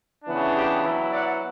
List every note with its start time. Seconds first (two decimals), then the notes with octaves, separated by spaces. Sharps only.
0.24 C#3 E3 B3 D4
0.53 G4
0.83 F#3 B3 E4
1.12 D5 F#5